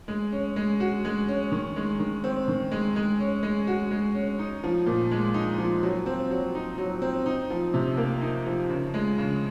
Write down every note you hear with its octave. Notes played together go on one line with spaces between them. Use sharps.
G#3
C#4
G#3
F#4
G#3
C#4
D#3
G#3
D#3
C4
D#3
G#3
G#3
C#4
G#3
F#4
G#3
C#4
D#4
F3
A#2
G#3
D#4
F3
F#3
C4
F#3
D#4
F#3
C4
D#4
F3
C3
A#3
D#4
F3
C#3
G#3
C#3